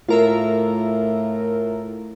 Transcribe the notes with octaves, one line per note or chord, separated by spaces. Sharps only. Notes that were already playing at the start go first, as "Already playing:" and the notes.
A2 F4 A#4 E5